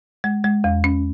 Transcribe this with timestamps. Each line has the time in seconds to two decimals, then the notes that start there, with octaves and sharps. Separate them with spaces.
0.24 G#3
0.44 G#3
0.64 E2
0.84 C#4